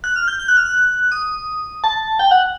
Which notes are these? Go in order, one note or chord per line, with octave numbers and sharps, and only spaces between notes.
F#6
F6
G6
G6
F#6
F6
F#6
D#6
A5
G5
F#5